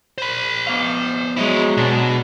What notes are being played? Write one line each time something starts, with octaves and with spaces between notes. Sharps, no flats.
C5 B5
F2 B3 F5
F#3 G#3 E4 D#5
B2 D4